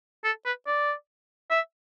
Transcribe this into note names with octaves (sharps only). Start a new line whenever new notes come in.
A4
B4
D5
E5